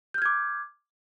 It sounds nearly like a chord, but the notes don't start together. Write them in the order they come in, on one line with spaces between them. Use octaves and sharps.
G6 F6 G#6 D6